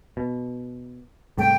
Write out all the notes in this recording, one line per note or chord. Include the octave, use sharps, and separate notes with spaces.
B2
C2 G#2 A3 G5